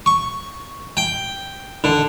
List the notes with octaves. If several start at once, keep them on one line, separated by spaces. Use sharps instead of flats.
C#6
G5
D3